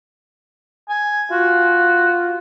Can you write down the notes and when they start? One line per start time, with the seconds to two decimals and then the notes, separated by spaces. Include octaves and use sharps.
0.89 G#5
1.31 F4 F#4